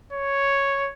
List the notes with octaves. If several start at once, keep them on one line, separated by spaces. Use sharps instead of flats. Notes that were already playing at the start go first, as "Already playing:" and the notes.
C#5